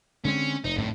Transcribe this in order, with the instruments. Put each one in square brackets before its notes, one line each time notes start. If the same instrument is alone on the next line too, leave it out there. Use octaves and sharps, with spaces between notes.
[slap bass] D3 G#3 C4 [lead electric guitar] C#4
[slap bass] F1 [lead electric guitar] D#4
[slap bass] F1 F2 [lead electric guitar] A2